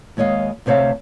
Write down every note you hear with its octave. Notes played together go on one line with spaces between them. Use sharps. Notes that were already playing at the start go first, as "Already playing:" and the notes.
D#2 G#3 C#5 D#5 F5
D2 C3 C5 C#5 E5 F5